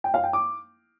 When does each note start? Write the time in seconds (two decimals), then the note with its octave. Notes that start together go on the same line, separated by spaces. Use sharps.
0.04 G5
0.14 F5
0.24 G5
0.33 D6